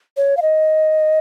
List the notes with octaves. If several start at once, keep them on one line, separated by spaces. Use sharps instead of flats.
C#5
F5
D#5